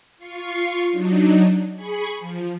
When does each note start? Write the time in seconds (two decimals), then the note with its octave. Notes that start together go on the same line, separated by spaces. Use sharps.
0.18 F4 C#6 C7
0.90 F#3 D4 D#4
1.75 G#4 G#5 B5 C#6
2.18 F3